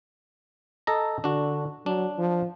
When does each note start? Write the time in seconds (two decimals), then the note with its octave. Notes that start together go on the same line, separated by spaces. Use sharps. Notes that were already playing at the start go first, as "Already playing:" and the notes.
0.87 A4 D#5 A#5
1.24 D3 D4 F#4
1.86 F#3 D4
2.18 F3